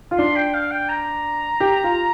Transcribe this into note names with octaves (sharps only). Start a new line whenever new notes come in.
F4
D4 C6
G5
F5
G5
A#5
G4
F4